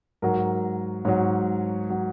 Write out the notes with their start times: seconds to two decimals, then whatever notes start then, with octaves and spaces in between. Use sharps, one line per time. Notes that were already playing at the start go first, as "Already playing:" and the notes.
0.22 G#2 F#3 A#4
1.05 G#2 F#3 C#5
1.90 F#3